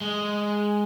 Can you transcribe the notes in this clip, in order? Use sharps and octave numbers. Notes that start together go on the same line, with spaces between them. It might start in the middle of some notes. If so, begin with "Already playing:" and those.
G#3